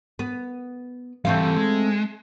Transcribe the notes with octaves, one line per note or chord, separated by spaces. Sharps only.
B3
E3 G3 A3 C4 F5
G#3